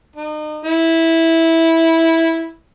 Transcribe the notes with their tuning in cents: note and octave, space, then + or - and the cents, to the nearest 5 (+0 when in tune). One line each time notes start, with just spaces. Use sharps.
D#4 -35
E4 -10